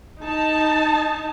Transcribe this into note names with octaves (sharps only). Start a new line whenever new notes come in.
D#4 A5